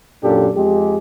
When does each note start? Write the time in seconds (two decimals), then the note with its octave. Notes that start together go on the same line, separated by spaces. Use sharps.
0.23 F#2 A#2 D4 G4 A4
0.56 F2 G#3 G4